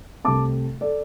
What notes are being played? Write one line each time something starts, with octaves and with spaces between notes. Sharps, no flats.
C2 C3 A3 C4 A5 D6
A4 D5